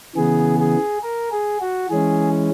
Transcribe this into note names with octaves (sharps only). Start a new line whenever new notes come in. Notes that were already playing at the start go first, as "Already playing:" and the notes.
C#3 E3 B3 G#4
G#4
A#4
G#4
F#4
E3 G#3 C#4 G#4